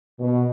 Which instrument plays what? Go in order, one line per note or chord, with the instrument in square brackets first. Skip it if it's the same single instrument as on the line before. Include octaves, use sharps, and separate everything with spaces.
[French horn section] B2